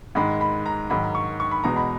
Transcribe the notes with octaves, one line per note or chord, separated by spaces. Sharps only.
G#2 D#3 G#3 B5
B5
A#5
G#2 D#3 F#3 B5
C#6
C#6
B5
E2 B2 G#3 A#5
B5